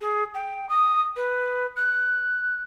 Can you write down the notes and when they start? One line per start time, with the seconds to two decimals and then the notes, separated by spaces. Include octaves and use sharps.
0.01 G#4
0.34 G5
0.69 D#6
1.16 B4
1.76 F#6